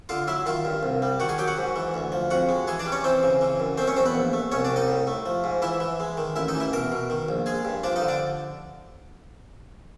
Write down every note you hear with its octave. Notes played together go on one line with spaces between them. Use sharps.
D3 F4 F5
F#3 E4 E5
D#3 F4 F5
G2
C2
G3
D#3 F#4 F#5
G#4 G#5
F#3 G4 G5
F#4 F#5
G#2
E3
D2
F3
F2 F#4 F#5
G#3
E3 G#4 G#5
D4 D5
G3
C#4 C#5
E3 C4 C5
C#3
E3
F#2
A3 C4 C5
C#4 C#5
E2 C4 C5
B3 B4
A#1
A3
C2 C#4 C#5
D4 D5
C2
D#4 D#5
A2
A3
F3
G#2
E3 E4 E5
E3
G#3
D#3
A1 E4 E5
D#4 D#5
E3
E4 E5
B2 A#4 A#5
B2
D#3
A#1
G#3 G#4 G#5
G2
F3 D4 D5
D#4 D#5
D3
D4 D5